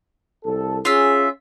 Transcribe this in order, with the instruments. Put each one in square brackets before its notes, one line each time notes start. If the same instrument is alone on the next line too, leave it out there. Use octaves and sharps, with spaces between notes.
[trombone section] C2 A4
[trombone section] C#4 G#4 [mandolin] F4 E5